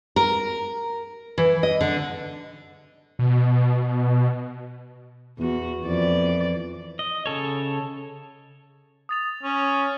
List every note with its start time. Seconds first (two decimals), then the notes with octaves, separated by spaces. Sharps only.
0.16 A#4
1.38 E3
1.63 D#5
1.81 D3
3.19 B2
5.38 E2 F#4
5.83 F2 E3 D5
6.99 D#5
7.26 C#3 A4 C#5
9.09 D#6 A6 F7
9.43 C#4